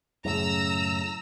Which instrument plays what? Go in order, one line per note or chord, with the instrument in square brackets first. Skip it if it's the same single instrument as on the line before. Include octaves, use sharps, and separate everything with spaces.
[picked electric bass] F#2 A2 C#3 [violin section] A#5 E6